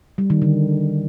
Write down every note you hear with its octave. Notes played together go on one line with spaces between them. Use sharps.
G3
D#3
D3